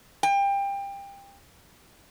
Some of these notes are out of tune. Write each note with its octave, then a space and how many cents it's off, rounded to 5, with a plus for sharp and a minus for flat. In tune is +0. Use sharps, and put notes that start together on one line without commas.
G5 +25